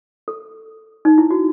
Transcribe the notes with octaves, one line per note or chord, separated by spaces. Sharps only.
A4
D#4
E4
F#4